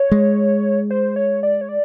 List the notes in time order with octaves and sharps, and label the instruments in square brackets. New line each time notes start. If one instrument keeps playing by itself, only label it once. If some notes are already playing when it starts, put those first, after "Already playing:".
Already playing: [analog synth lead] C#5
[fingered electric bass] G#3
[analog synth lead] C5
C#5
D5
C#5
D5